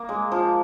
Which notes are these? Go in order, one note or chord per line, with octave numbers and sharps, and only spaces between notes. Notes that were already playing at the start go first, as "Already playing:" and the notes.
Already playing: A#3
G#3
F3